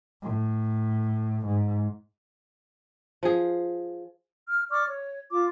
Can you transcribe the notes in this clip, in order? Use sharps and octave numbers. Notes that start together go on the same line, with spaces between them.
A2
G#2
F3 G#4
F6
D5 C#6 D6 F6
C#5
F4 D6